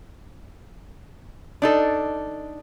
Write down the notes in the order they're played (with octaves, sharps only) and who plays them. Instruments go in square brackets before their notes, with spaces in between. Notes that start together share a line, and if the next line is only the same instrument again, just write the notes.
[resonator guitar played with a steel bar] D4 D#4 A4